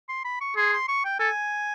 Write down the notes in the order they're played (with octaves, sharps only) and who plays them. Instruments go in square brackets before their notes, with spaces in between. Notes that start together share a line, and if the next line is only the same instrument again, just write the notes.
[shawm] C6
B5
C#6
[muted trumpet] G#4 [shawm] C6
[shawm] C6
C#6
G5
[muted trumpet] A4 [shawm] G#5